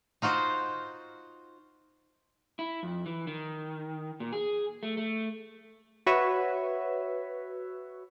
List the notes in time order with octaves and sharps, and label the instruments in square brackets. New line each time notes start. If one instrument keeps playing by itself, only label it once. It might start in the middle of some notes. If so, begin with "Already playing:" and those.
[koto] D#4 F4 F#4 C5
[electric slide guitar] E4
F2
E3
D#3
A#2
G#4
A3
A3
[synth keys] F#4 B4 C#5 E5